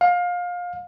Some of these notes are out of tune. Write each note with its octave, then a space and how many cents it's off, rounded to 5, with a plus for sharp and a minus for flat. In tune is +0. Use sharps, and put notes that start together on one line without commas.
F5 +25